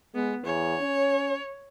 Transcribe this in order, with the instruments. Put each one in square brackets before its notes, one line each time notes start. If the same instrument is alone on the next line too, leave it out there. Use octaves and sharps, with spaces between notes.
[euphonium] G#3 [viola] B3
[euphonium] E2 [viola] C#5
[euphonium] C#4